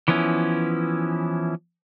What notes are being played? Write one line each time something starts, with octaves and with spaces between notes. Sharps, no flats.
E3 F3 B3 C#4 E4